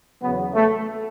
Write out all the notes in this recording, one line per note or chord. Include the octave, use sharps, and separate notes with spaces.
E2 C#3 F#3 B3
A3